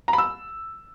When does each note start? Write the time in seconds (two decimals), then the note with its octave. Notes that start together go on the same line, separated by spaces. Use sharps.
0.08 A#5
0.13 B5
0.18 E6